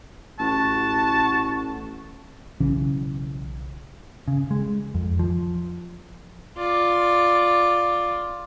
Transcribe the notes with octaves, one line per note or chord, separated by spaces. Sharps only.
A1 F#4 A5
B1 C#3 E3 C#4
C#3
G#3
F2
F3
F4 D5